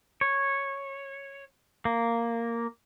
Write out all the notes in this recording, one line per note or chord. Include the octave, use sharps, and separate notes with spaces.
C#5
A#3